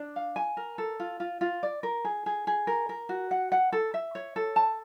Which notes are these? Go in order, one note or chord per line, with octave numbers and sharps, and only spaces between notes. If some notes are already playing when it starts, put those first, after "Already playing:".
Already playing: D4
F5
G#5
A#4
A4
F4
F4
F4
D5
A#4
G#4
G#4
G#4
A#4
A#4
F#4
F#5
F#5
A4
E5
C#5
A4
A5